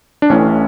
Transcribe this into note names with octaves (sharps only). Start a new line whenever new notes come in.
D4
A1 A2 E3 C#4